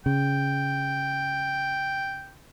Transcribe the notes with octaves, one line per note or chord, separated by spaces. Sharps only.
C#3 G5